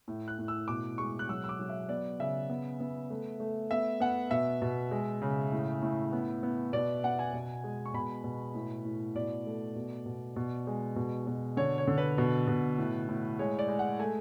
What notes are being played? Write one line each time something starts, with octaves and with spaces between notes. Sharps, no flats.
A2
F#6
A2
E6
B2 D6
G#3 C#6
F#6
F#3 E6
E6
D6
F#3
E5
B3 D5
C#3 E5
B3
B3
A3
A3
B3 E5
B3 F#5
B2 E5
B2
G#3
C#3
A2
A2
B3
B3
B2 D5
B3 F#5
G#5
B2
G#3
C#6
B2 B5
B2
A2
A2
B2 D5
A3
B2
B2
B2
G#3
B2
B2
D3 C#5
C#5
D3
B4
B2
B2
A2
A2
G#3 C#5
D5
G#3
F#5
A3 G#5